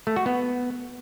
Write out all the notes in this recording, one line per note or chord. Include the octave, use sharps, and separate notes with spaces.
A3
F#4
B3